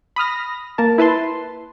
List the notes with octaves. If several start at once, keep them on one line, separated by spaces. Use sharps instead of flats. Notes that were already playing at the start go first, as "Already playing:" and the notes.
B5 D#6 F6 A#6
A#3 A#4 A5
E4 B4 A5 C6